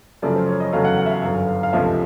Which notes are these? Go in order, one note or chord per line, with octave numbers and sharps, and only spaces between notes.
F#2 C#3 F3 A3 D5
C5
C#5
D#5
E2 C#3 F#3 A3 F5
F#5
F#5
E5
F5
G1 F#2 D3
F5
C#2 C3 F3 A3 C#4 E5